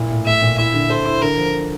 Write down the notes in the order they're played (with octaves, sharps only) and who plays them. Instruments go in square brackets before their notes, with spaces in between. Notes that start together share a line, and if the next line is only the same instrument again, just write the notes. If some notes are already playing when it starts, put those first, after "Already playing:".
Already playing: [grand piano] A#2 E4
A2
[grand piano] A3 [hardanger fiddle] E5
[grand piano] A#2
[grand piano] E4 [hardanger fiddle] E5
[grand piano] D3
[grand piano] A4 [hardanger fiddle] C5
[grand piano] E4
[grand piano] D3 [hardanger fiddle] A#4
[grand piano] F3